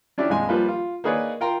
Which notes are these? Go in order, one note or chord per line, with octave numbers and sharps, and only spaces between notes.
C#4 D4 E4 G4 D5
A#1 F2 G#3 G#5
F3 G3 A#3 F4 B4
F4
A#3 D#4 G#4 B4 C#5 D5
F4 A#4 G5 A#5 C6